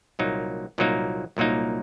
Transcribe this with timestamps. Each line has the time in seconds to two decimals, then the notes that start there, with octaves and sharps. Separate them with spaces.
0.19 C2 A#2 F#3 A#3 D#4
0.78 C2 A#2 F#3 A#3 D#4
1.37 C2 A#2 F#3 A#3 D#4